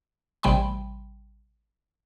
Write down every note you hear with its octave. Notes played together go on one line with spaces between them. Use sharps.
A1 C3 G3 G5 B5 C6